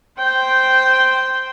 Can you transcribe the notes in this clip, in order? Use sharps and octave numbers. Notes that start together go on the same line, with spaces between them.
C5 G5